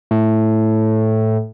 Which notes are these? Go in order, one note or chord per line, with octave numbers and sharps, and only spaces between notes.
A2